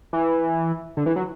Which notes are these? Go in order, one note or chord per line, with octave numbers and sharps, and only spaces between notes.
E3
D3
E3
F#3